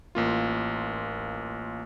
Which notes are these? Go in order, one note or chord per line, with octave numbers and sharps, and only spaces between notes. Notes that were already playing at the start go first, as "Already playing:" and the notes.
A1 A#3 F4